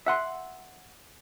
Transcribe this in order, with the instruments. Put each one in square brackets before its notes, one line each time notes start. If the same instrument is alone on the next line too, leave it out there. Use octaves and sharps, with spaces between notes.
[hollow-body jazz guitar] E5 F#5 C6